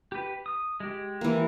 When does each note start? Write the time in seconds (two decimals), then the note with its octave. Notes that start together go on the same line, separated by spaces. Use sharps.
0.12 G4 B4
0.46 D#6
0.80 G#3 G4
1.21 E3 A#3